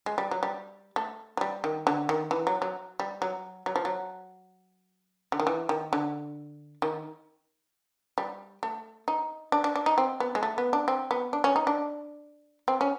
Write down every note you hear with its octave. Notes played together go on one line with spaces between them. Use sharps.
G#3
G3
F#3
G3
A3
F#3
G3
D#3
D3
D#3
E3
F#3
F#3
G3
F#3
F#3
F3
F#3
D3
D#3
E3
D#3
D3
D#3
G3
A3
D#4
D4
D4
D4
D#4
C4
B3
G#3
A3
B3
D4
C4
B3
D4
C#4
D#4
D4
C4
C#4